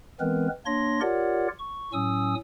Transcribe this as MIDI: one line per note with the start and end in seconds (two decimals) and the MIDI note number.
0.20 0.48 52
0.20 0.48 56
0.20 0.48 59
0.20 0.48 60
0.20 0.48 70
0.20 0.48 71
0.66 1.01 58
0.66 1.01 62
0.66 1.01 73
0.66 1.01 84
0.66 1.01 94
1.01 1.48 65
1.01 1.48 67
1.01 1.48 70
1.01 1.48 73
1.01 1.48 74
1.01 1.48 78
1.59 1.92 85
1.93 2.35 45
1.93 2.35 54
1.93 2.35 61
1.93 2.35 80
1.93 2.35 87
1.93 2.35 88